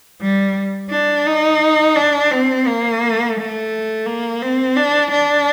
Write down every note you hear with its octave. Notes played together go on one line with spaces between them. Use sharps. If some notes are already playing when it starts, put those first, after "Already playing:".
G3
D4
D#4
D4
C4
A#3
A3
A#3
C4
D4
D4